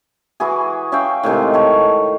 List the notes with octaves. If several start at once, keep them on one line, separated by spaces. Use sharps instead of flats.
E3 E4 F#4 G#4
C#4 E5 F5 G5
A2 C3 D#3 G#3
C#5 A5